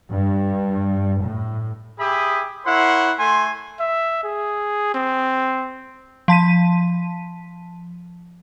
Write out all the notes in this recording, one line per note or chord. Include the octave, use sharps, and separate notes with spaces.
G2
A2
G4 G#4 E5 B5 D#6
E4 A#4 C#5 F#5 C6
A3 G#5 C6
E5
G#4
C4
F3 A5 B6 D#7